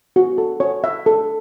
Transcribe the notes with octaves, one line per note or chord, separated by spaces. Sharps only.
F#4
A4
C#5
E5
A4